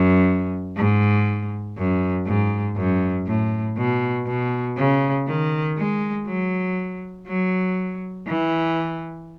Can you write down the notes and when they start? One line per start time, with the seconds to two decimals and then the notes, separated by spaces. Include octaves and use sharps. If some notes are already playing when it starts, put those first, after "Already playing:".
Already playing: F#2
0.77 G#2
1.77 F#2
2.26 G#2
2.76 F#2
3.27 A2
3.77 B2
4.27 B2
4.77 C#3
5.28 D#3
5.78 G#3
6.27 F#3
7.27 F#3
8.27 E3